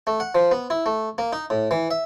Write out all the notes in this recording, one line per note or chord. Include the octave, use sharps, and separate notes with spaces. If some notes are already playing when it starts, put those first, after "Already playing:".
A3
F#5
F3
B3
E4
A3
A#3
D#4
A2
E3
E5